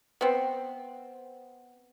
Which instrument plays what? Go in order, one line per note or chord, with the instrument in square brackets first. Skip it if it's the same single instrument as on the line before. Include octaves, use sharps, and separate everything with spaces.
[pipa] B3 C4